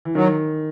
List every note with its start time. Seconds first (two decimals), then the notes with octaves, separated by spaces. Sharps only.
0.05 E3
0.15 D#3 F#3